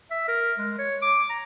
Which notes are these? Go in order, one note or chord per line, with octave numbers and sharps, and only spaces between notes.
E5
A#4
G#3
C#5
D6
A#5